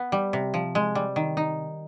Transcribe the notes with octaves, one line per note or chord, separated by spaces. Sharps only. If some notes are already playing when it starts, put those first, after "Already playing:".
Already playing: B3
G3
C3
F3
G#3
G3
D#3
D#4